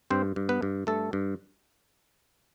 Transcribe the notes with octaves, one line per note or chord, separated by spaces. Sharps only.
G2 C4 C5
G2
B3 B4
G2
G2 A3 A4
G2